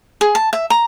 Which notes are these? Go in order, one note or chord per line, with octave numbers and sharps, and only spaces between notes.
G#4
A5
E5
A#5